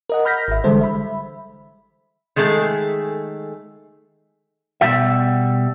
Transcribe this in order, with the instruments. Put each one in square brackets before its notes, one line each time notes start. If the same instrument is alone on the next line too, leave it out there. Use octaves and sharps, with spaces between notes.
[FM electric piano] A#4 D#5 F#5
B5 F6 G6 A#6 B6
G#1 E5
D3 E3 G3 G#3 A4 C5
E5 B5
[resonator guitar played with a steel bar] D#3 G#3 A3 G#4 A4
[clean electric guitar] B2 G3 G4 E5